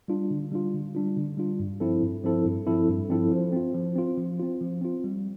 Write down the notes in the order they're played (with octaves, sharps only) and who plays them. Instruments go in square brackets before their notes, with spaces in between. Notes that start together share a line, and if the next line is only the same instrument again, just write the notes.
[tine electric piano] G3 D4 F4
D3
G3 D4 F4
D3
G3 D4 F4
D3
G3 D4 F4
G2
F3 C4 E4 A4
G2
F3 C4 E4 A4
G2
F3 C4 E4 A4
G2
F3 C4 E4 A4
F3
C4 F4
F3
C4 F4
F3
C4 F4
F3
C4 F4
G3